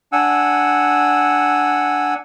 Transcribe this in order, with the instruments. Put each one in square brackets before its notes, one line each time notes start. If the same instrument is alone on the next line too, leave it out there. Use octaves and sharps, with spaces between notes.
[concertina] D4 F#5 G#5 E6